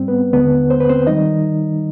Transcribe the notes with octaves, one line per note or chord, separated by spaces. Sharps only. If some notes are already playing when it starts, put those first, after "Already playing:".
Already playing: G#2 G3 C4
B3 B4
D#2 D3 G#3 B3 B4
C5
B4
C4 C5
D#3 G3 D#4 D#5